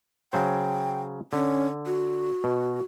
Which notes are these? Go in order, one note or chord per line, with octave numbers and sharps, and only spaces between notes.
C#3 F#3 C5 G5
D3 C#4
F#4
B2